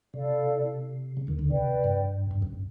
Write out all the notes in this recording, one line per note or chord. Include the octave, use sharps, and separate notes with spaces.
C3 E4 A4 D5 F5
C#3
D#2 D#3
D2 D3
C3 B4 D5 G5
G2
G2
F#2